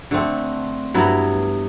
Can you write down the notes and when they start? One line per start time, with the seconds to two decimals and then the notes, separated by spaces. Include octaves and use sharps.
0.11 D3 A3 C4
0.94 G2 F#3 B3 E4